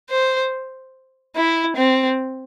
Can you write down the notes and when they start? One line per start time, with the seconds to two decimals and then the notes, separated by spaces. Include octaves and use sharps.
0.10 C5
1.36 E4
1.77 C4